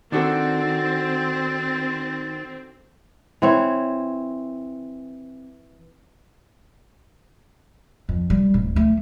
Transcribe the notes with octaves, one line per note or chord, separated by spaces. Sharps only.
D#3 C4 D4 F#4 A4 A6
E3 C4 C#5
F2
G3
D1
A3